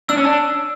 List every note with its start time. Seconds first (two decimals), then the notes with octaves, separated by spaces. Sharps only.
0.09 D4 E6
0.17 C#4
0.24 D4